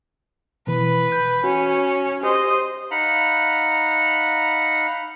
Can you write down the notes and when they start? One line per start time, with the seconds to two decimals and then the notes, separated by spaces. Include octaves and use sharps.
0.67 B2 E3 B4
1.12 G6
1.44 C#4 F#4
2.23 G4 C5 D#5
2.91 D#4 F5 F#5 A#5 B5